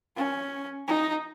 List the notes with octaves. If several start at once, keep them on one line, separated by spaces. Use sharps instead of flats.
C#4
D#4